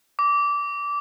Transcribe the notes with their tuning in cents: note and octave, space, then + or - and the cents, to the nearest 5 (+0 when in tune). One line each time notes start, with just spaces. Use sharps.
D6 -20